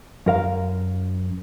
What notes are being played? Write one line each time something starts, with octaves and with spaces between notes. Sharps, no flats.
F#2 A#4 F5